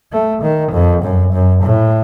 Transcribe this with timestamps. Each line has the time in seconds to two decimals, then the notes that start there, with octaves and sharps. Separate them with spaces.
0.12 A3
0.42 D#3
0.73 F2
1.03 F#2
1.33 F#2
1.63 A2